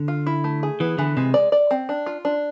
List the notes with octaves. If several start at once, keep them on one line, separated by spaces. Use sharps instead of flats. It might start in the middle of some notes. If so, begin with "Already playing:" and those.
Already playing: D3
F4
E4
A3
G#4
E3 B3
D3 E3
C3 G#3
D5
D5
C4
D4
F4
D4